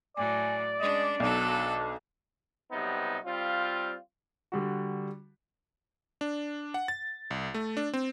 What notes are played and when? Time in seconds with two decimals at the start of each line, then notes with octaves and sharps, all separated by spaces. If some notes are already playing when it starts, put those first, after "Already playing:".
0.17 A2 F#3 D5 G#5
0.80 G#3 C#4 D4 D#5
1.20 B1 D#3 F#3 D4 A4
2.72 B1 C3 G3 B3 D#4
3.26 G3 C4 F4
4.52 D3 G3 F#4
6.21 D4
6.74 F#5
6.88 A6
7.31 C2
7.54 A3
7.77 D4
7.93 C4